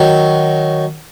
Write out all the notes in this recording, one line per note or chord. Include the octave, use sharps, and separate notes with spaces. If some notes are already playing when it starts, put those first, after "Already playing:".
Already playing: D#3 F#3